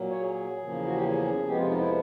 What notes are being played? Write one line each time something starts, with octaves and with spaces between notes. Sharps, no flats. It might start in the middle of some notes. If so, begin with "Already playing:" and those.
Already playing: A#2 F#3 A#3
C#5
G#4
E2 C#3 F3 A#3
F#4
G4
G#4
F2 C3 F3 G#3 B3 G4
F4
D#4
E4